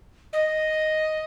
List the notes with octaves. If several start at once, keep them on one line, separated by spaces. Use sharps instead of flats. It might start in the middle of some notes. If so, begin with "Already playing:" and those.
D#5